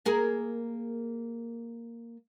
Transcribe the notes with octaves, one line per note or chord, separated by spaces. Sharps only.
A#3 G#4 A#4